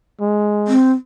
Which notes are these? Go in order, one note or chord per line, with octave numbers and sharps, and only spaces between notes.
G#3
C4